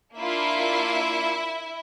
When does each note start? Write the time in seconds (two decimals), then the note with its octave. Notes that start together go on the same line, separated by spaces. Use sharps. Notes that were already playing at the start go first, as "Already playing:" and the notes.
0.17 A#3 D4 E4 F4 E5